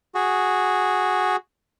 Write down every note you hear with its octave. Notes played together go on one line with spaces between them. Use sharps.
F#4 G#4